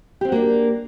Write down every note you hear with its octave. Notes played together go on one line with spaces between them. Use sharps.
A#3 C4 D4 F#4 G4